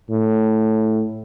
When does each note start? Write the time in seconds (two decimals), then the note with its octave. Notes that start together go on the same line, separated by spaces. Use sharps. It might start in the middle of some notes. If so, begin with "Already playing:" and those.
0.10 A2